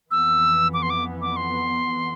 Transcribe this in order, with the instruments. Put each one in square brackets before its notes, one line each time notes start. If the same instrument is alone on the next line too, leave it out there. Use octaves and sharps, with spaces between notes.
[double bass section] F2 E3 B3 [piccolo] E6
[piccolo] D6
C6
D6
D6
C6